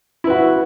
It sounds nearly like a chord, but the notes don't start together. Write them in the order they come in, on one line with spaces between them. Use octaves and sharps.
E4 B4 F#4